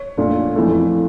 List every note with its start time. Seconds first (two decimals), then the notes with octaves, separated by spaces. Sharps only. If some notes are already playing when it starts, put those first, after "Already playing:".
Already playing: C#5
0.17 A#2 A3 D4
0.55 F2 E3 A3